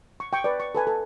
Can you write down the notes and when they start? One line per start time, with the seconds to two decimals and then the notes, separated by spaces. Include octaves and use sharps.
0.20 C#6
0.33 G5 C#6
0.44 B4 D5
0.60 C#6
0.75 A4 B4 G#5
0.87 A4